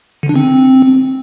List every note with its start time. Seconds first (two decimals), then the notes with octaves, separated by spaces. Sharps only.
0.23 D3
0.29 D4
0.36 C4